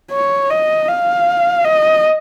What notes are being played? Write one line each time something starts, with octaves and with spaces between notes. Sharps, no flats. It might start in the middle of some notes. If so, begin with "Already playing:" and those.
C#5
D#5
F5
D#5